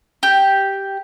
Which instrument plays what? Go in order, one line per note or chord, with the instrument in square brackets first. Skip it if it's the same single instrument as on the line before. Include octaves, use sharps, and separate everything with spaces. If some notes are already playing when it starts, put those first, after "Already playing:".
[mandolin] G4